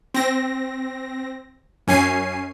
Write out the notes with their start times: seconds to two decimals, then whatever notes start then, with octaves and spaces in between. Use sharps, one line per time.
0.14 C4 A#6
1.87 F#2 C#4 G#5 C7 D#7